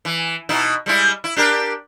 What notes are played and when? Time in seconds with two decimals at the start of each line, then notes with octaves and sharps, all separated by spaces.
0.05 E3
0.49 B2 D#4 E4
0.86 G3 G#3 E4
1.24 E4
1.36 D4 G4 A#4